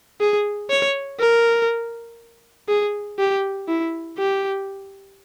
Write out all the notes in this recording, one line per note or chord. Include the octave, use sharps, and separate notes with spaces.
G#4
C#5
A#4
G#4
G4
E4
G4